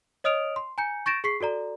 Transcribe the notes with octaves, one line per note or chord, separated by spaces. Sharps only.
C#5 D#5 D#6 F6 D7 F7
C6
G#5 A#5 G6 C#7
C#6 G6 A6 A#6 D7 E7
G#4 C#6 B6 C7
F#4 A4 D5 A#5